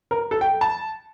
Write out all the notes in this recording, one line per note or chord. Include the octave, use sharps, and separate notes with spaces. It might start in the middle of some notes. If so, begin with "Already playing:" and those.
A#4
A4
G5
A5